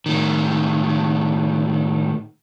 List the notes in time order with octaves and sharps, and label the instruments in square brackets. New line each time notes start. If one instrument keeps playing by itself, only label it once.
[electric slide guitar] A2 D#3